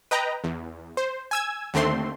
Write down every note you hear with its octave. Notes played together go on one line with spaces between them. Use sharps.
B4 D#5 G5 A#5
E2
C5
G#5 E6 G#6
D#2 D3 A3 C4 C6